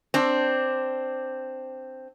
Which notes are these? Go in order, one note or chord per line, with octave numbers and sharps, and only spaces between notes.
C4 D4